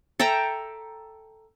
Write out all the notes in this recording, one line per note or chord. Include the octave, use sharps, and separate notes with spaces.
A4 E5 G5 A#5